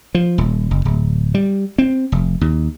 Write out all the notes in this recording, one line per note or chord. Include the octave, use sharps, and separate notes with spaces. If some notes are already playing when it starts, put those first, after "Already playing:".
F3
D#1
F#1
D1
G3
C4
F1
D#2